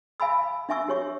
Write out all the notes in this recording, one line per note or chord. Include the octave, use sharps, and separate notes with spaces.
F5 G#5 B5 E6
D4 E5 G#5 C#6 E6
G4 C#5 C#6